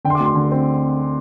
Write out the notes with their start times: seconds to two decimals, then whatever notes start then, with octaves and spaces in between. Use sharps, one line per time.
0.05 D3 G5
0.10 C6
0.15 D6
0.20 D2
0.25 C6
0.35 D3
0.52 C4